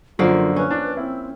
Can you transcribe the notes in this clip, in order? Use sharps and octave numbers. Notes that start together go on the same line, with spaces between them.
F#2 D3 F3 A#3 F4
C#4 B4
D4
C4 E4